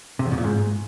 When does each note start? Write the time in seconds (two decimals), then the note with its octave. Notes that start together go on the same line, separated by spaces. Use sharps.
0.19 C3
0.26 E2
0.32 B2
0.38 A#2
0.44 G#2